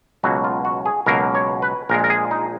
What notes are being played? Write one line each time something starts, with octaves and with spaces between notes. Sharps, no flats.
C#2 B2 F#3 A#3 F#4
F4
F#4
G#4
C#2 B2 F#3 A#3 A#4
C#5
B4
A#1 A#2 G#3 A#4
A#4
G#4
D#4